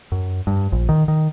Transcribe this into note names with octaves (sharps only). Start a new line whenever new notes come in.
F#2
G2
A#1
D#3
D#3